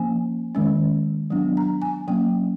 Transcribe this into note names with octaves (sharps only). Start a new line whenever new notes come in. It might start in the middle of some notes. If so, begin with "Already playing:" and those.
Already playing: F3 A#3 C#4 G#5
D#3 G#3 C#4
F#3 B3 D4
A#5
G#5
F#3 A#3 C#4 G5